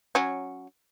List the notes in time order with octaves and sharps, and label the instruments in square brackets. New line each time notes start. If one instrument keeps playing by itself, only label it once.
[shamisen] F#3 C#4